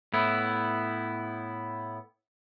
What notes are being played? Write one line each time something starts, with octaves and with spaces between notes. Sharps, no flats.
A2 B3 E4